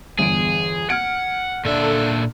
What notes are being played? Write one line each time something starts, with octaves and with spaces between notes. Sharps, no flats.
G1 E2 G#4 D7
F#5 F6 G#6 D7
A#2 D3 D4 A4 E5